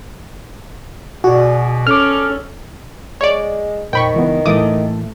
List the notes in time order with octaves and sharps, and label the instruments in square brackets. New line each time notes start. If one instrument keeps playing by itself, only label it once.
[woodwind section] B2 [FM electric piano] F#4 [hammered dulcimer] G#4 D5
[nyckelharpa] C#4 [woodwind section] A4 [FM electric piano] D6 F6
[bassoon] G#3 [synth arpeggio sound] C#5 D5
[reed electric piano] F2 A#2 C5 [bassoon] D#3 [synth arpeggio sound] G5 B5 C#6
[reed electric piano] C#2 E3 B3
[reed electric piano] A2 E3 A#3 [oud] A3 [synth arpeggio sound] D6 D#6